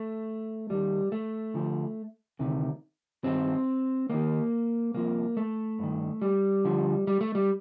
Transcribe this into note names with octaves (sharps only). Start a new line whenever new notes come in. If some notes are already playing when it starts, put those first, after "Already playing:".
Already playing: A3
D#2 D#3 G3
A3
D2 D3 F3
D2 C3 D#3
G2 D#3 C4
D#2 D#3 A#3
C2 C3 F3 A#3
A3
G2 D#3
G3
D2 D3 F3
G3
A3
G3